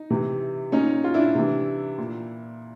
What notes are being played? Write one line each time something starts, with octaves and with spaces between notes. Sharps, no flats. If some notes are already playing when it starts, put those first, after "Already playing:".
Already playing: D#4
C3 E3
A#2 C#4 D#4
F4
D4 E4
C3 E3
A#2